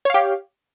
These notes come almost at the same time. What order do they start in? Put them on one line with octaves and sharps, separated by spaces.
C#5 F5 G4